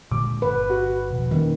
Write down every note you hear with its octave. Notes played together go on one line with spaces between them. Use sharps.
A#2 D3 G#3 D6
G1 B4
F#4
E1 B2 F3
D#3 G3 A#3 C#4